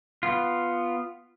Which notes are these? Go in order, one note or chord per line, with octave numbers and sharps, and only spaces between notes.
B3 F4